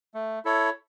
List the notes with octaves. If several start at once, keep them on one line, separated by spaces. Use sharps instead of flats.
A3
E4 A4 C#5